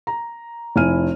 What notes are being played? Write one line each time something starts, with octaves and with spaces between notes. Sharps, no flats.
A#5
F1 E4 G#5 F6 D#7